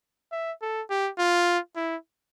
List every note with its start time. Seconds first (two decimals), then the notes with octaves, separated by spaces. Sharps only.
0.32 E5
0.62 A4
0.90 G4
1.18 F4
1.76 E4